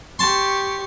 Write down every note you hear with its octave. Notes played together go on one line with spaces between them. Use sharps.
G4 A5 C6 C#6